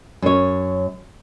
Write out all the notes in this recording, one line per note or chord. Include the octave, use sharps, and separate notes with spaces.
F#2 C#5